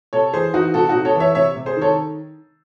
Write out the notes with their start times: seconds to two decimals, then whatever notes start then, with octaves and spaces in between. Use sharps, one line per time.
0.13 C3 A4 C#5
0.33 E3 G#4 C5
0.54 E3 D#4 F#4
0.74 C3 F#4 A4
0.89 D#4 F#4
0.95 C3
1.05 A4 C#5
1.15 E3
1.20 C#5 E5
1.35 C3 C#5 E5
1.56 C3
1.66 G#4 C5
1.77 D#3 A4 C#5